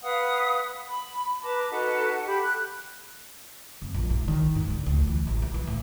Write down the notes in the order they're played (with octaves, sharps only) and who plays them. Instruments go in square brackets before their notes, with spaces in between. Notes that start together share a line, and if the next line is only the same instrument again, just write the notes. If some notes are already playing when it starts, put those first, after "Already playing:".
[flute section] B4 F5 F#5 D#6
B5
B4 A5 A#5 D6
D#4 F#4 A4 B4
G4 A4 B5
F#6
[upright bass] F1
A#1
G#2
D#3
G#2
D3
D2
E3
A1
E3
E3
A2